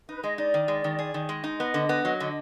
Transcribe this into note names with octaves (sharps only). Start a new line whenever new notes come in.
D#4 B4
G#3 D#5
D#4 D5
D#3
G#3
D#3
G#4
D#3
G#3
D#4
B3 D#5
D3
B3
F#3
D3